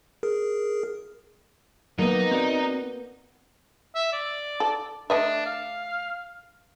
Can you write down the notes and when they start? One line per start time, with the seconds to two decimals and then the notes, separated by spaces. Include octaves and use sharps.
0.23 G#4 A#4
1.99 F#3 A#3 B3 D#4
2.31 C4 F#4 D5
3.95 E5
4.13 D5
4.60 A4
5.10 A3 D4 D#5 E5
5.46 F5